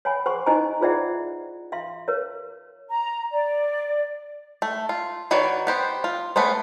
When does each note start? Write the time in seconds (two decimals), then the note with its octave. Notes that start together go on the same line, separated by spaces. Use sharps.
0.05 C#5 F#5 G#5 B5
0.26 G#4 C5 F#5 C6 C#6
0.46 D#4 E4 C5 D#5 G#5 A#5
0.81 F4 G#4 C5 D5 E5 F#5
1.72 E5 F5 C6
2.08 A#4 C#5
2.90 A#5
3.32 D5
4.62 A3
4.89 F4
5.31 D#3 F#4 B4 C#5 D5
5.67 B3 G4 C5
6.04 F4
6.36 A3 B3 C#4 C5